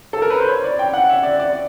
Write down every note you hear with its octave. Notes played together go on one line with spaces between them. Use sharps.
A4
A#4
B4
C5
C#5
D5
G5
F#5
E5
D5
D5